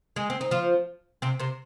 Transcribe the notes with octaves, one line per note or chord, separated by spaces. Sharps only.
G#3 G#4
C4
D#4
F3 F4
C3 C4
C3 C4